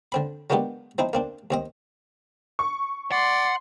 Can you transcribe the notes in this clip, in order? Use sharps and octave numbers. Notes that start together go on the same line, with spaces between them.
D3 C4 B5
F#3 G#3 A#3 B3 D4 G4
F3 C4 D#4 E4
A#3 C4 D4
D#2 C4 D#5
C#6
D5 F#5 C6